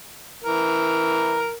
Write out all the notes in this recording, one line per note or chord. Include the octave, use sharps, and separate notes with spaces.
E3 A#4